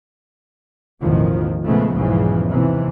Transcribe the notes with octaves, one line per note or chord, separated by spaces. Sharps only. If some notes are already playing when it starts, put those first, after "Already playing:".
A1 E2 B2 D#3 F3
A#2 C#3 F3 G#3 A3 B3
B1 E2 G#2 C#3 E3 F3
D#2 C3 E3 C4